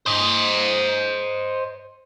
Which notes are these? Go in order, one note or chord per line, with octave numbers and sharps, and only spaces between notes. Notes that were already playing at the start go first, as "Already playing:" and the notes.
C5 D#5